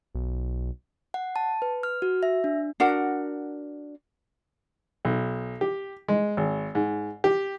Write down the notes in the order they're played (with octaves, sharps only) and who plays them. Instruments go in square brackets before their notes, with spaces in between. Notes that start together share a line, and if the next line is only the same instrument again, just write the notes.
[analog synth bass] B1
[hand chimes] F#5
A5
B4
F6
F#4
E5
D4
[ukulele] D4 F#4 A#4 F#5
[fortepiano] B1
G4
G#3
G#1
G#2
G4